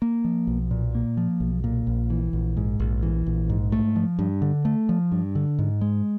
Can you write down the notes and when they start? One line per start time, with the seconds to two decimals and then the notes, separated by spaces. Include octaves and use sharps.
0.02 A#3
0.24 F3
0.47 B1
0.71 A#2
0.95 A#3
1.17 F3
1.40 B1
1.64 A#2
1.87 A#1
2.10 E3
2.33 A#1
2.57 G#2
2.80 A#1
3.03 E3
3.27 A#1
3.50 G#2
3.72 A3
3.96 F3
4.19 G2
4.42 D3
4.65 A3
4.89 F3
5.12 G2
5.35 D3
5.59 G#2
5.81 G#3